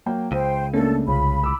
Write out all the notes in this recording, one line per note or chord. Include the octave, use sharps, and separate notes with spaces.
F#3 A#3 G5
C#2 C5 G5 D#7
A3 A#3 C#4 D4 A4
C2 C#3 F4 B5
D6 E6